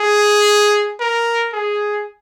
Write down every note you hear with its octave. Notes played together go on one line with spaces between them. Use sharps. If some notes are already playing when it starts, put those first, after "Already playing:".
Already playing: G#4
A#4
G#4